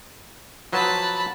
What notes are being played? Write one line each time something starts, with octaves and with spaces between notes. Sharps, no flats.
F3 F#3 B4 A5 B5